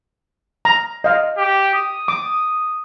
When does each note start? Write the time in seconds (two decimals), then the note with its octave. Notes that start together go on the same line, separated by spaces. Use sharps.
0.65 A#5
1.04 D#5 F5
1.38 G4
1.74 D#6
2.08 D6